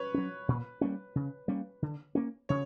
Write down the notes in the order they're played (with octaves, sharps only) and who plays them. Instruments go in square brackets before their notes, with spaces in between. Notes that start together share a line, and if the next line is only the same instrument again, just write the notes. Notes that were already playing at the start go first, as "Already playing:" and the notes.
Already playing: [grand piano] B4 C#5
[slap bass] F#3 C#4
A#2
G3 A#3 C#4
C#3
G3 A#3 C#4
D3
A#3 C#4
[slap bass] C#3 [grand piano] C#5